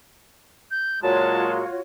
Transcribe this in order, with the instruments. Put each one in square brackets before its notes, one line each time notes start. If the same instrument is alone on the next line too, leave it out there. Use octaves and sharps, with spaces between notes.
[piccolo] G6
[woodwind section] A#2 F#3 G#3 [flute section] F4 F#4 C#5 [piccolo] A5